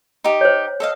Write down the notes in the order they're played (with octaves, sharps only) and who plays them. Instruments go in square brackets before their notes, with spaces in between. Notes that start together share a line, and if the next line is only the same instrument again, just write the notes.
[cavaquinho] D#4 G4
[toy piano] C5 C#5
[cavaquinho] A4 D#5 F5